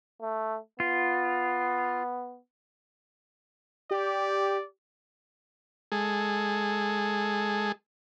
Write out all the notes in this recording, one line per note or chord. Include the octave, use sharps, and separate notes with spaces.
A3
B3 F4
G4 D5
G#3 G#4 A4